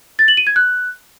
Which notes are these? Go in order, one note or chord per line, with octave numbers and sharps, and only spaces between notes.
A6
F#7
D#7
G#6
F#6